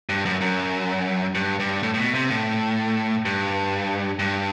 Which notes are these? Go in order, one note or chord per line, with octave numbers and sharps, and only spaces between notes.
G2
F#2
F#2
G2
G2
A2
A2
B2
C3
A2
G2
G2